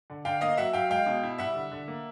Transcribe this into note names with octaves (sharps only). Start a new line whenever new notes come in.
D3
D3 F5 G5
A#3 D#5 F5
F#3 E5 F#5
F#3 F5 G5
G#3 F5 G5
B2
E4
G3 E5 F#5
D3
D3
A#3